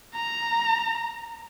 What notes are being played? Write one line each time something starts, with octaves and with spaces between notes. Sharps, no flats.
A#5